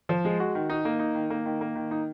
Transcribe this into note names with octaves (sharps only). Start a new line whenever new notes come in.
F3
G#3
F#4
D#3
D#4
A#3
D#4
D#3
A#3
D#3
A#3
D#3
D#4